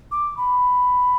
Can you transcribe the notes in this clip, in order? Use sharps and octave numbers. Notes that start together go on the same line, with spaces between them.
D6
B5